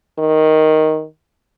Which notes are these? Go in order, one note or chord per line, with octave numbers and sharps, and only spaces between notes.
D#3